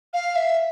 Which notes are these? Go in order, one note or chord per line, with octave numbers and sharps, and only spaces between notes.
F5
E5